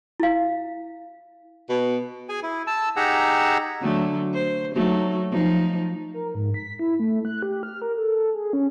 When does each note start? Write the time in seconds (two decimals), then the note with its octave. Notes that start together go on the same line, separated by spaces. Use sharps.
0.20 E4 F5
1.69 B2
2.29 G#4 G#5
2.43 E4
2.67 A5 E6
2.96 D#4 G4 G#4 F#5 A#5 E6
3.81 D3 F#3 A3
4.34 C5
4.75 F#3 A3 D#4
5.31 F3 D#4
6.14 A#4
6.35 G#2
6.54 B6
6.79 E4
7.00 A3
7.25 F#6
7.43 G4
7.63 F6
7.82 A#4
7.97 A4
8.35 G#4
8.53 C#4